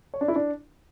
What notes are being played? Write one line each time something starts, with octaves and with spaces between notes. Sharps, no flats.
C#5
D4
E4
D4